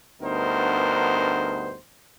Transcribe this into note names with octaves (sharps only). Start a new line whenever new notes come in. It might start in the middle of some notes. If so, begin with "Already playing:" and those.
D2 G2 B3 D#4 A#4 C5